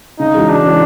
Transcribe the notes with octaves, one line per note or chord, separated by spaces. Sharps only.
C#3 D#4
E3 G#3 C#4 F#4
C#3 D4
E3 G#3 C#4 F#4